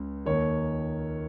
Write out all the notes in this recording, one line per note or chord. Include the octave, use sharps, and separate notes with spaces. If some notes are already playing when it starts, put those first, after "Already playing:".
Already playing: C#2 C#3
D#2 D#3 C#5